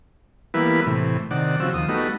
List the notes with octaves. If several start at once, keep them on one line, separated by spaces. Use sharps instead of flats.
E3 G3 A#3 B3 E4 B4
A2 C3 E3
C3 D#3 D5 F#5
C#3 F3 C4 F#4 E6
D#2 F3 D#6
G3 A3 B3 D#4 F#4